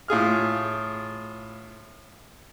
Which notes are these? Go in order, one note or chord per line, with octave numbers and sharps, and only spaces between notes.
A2 F4 G#4 F6